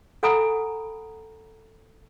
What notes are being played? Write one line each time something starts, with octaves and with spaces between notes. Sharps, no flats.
A4 F#5 G#5 A#5 B5 D#6